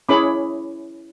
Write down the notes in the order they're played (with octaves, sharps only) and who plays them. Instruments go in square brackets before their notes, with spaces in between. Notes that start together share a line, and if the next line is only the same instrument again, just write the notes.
[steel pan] C#4 E4 G#4 C#5 B5 D6